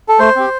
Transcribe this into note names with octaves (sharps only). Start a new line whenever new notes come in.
A4
A3 C5
C4 G4